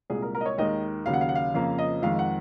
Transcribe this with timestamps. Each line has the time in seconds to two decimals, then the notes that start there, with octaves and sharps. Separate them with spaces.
0.10 C2 A#2 G#3 G#4
0.22 A#4
0.35 A#4
0.41 D#5
0.46 C#5
0.58 D#2 D#3 G#3 D#5
1.06 D#2 C#3 F#3 F5
1.14 F#5
1.21 F5
1.29 F#5
1.35 F5
1.54 F2 C#3 F3 A#3 F5
1.79 D#5
2.02 F2 D#3 G#3 F5
2.19 F#5